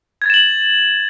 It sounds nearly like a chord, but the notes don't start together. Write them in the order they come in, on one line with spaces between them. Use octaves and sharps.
G#6 A6 E7 F#7